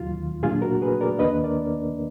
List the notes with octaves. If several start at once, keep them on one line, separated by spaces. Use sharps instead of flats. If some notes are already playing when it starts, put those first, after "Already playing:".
Already playing: D#2 D#3 F#3 F4
A#2 F#3 A#3 D4 F4 G#4
F#4 A#4
G#4 B4
A#4 D5
D#2 D#3 A#3 D4 B4 D#5
A#4 D5